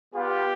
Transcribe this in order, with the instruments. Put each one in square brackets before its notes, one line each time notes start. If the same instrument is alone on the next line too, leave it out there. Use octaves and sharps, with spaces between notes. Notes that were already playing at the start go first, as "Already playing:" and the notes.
[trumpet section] G3 B3 F4 G4